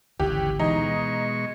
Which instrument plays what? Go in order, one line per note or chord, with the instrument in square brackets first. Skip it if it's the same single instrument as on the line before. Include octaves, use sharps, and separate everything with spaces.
[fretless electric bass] G#1 D2 [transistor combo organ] C#3 E3 F#5 [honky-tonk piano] G4
[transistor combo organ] B2 G#3 C#6 [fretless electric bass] E3 [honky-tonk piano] D#4